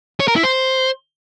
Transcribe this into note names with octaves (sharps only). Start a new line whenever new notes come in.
C#5
A#4
E4
C5